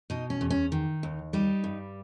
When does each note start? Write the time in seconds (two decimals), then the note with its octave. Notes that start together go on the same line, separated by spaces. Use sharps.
0.10 B2 D#4
0.30 C#4
0.41 E2
0.50 C#4
0.72 D#3
1.03 D#2
1.33 G3 D#4
1.64 G2